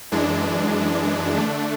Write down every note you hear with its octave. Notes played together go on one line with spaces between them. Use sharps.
F#2 E3 G#3 D4
D3 A3 D4